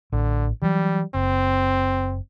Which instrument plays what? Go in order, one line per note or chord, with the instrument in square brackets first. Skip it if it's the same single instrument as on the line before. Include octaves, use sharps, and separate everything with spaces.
[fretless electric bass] A1 [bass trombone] D3
[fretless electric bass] E3 F#3 [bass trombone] G3
[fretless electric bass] F#1 [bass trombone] C4